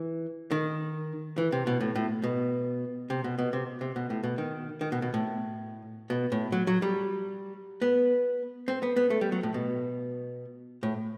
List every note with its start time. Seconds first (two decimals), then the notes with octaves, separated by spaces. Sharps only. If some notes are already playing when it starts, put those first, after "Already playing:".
Already playing: E3
0.51 D#3
1.38 E3
1.52 C3
1.67 B2
1.81 A2
1.95 A2
2.23 B2
3.10 C3
3.24 B2
3.39 B2
3.53 C3
3.81 C3
3.96 B2
4.10 A2
4.23 B2
4.38 D#3
4.81 D#3
4.92 B2
5.02 B2
5.14 A2
6.10 B2
6.32 A2
6.52 F#3
6.67 F#3
6.82 G3
7.82 B3
8.68 C4
8.83 B3
8.96 B3
9.10 A3
9.21 G3
9.32 F#3
9.43 A2
9.54 B2
10.83 A2